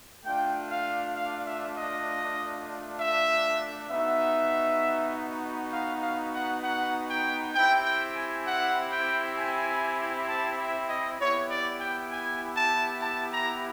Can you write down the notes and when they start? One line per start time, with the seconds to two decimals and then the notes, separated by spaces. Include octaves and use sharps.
0.25 A3 D4 F4 G5
0.70 F5
1.16 F5
1.46 E5
1.77 D#5
2.98 E5
3.90 B3 D#4 F#4 E5
5.73 F5
6.03 F5
6.34 F#5
6.64 F#5
7.09 G5
7.55 C4 E4 G4 G5
7.85 G5
8.16 G#5
8.46 F#5
8.92 G5
9.37 G#5
10.28 A5
10.58 E5
10.89 D#5
11.20 B3 E4 G4 C#5
11.50 D5
11.81 G5
12.12 G#5
12.57 A5
13.02 A5
13.33 A#5